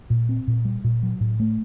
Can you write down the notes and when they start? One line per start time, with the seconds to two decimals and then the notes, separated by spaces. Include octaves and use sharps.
0.10 A#2
0.29 C4
0.48 A#2
0.65 G3
0.84 A#2
1.03 F#3
1.21 A2
1.40 A3